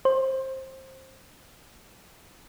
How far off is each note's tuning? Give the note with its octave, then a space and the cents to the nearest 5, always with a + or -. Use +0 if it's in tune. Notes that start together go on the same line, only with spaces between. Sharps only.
C5 +15